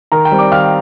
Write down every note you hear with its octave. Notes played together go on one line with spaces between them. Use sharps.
D#3 A#4 A#5
G5
G3 C4
D5 D6
D#3 F5 F6